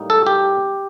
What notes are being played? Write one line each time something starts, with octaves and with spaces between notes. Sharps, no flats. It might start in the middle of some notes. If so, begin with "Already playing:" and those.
Already playing: A2 G3 A#3 D#4
A4
G4